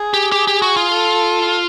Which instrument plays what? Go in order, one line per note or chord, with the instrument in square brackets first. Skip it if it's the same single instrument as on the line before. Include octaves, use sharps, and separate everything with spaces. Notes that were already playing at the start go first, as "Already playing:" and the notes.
Already playing: [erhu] G#4
[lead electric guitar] G4
G4
G4
F#4
F4
[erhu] A4